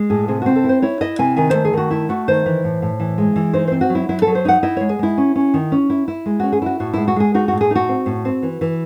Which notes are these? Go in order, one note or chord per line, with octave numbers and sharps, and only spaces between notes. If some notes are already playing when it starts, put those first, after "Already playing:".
Already playing: G#3
A2 G#4
C3 G#4
C4 F#4
A4
E4
C5
E4 C#5
E4 D#5
C3 G#5
D#3 G#5
A3 C5
G#4
D#3 F#4
A3 E4
A3 F#4
D#3 C5
E3
A2
A2
E3
G#3
E3
D#4 C5
C4 C5
F#4
F#3
E4
F#3 E4
F#3 A4
C5
D#4 F#5
E4 D#5
G#3 C#5
G#4
G#3 E4
C#4
C#4
D#3
C#4
E4
E4
G#3
C#4 F#4
G#4
E4 F#4
A2 F#4
G#3 E4
F#4
G#3 G#4
D#4 F#4
A2 F#4
G#4
D#4 F#4
C4
A2
C4
E3
E3